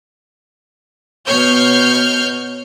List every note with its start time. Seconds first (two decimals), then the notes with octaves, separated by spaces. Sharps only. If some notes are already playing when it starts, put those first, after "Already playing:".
1.27 B2 C#5 F6 G6